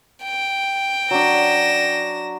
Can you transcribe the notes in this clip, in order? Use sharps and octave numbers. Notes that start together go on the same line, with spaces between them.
G5
F#3 D4 A#6 E7